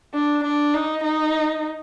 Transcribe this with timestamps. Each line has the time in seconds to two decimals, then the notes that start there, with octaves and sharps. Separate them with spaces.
0.14 D4
0.44 D4
0.74 D#4
1.03 D#4